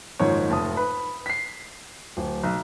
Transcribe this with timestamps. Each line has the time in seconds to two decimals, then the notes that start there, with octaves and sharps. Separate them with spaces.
0.20 F#1 G#2 D#3 F3 C#5
0.50 F1 A5 D#6
0.77 B4 B5
1.26 B6 C7
2.17 D1
2.44 B1